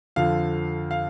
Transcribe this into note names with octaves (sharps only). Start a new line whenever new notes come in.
F2 D3 F3 F5
F5